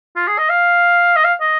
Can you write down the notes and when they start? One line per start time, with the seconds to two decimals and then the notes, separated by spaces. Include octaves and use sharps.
0.16 F4
0.28 G#4
0.38 D#5
0.49 F5
1.16 D#5
1.24 F5
1.41 D#5